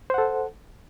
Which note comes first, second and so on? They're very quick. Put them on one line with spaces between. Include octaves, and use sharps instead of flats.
C5 F#5 A4